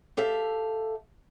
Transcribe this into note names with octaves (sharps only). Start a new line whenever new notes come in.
G4 A4 E5 F5